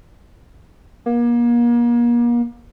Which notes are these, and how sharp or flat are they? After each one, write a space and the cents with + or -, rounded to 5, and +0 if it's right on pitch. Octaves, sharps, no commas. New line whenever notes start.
A#3 +35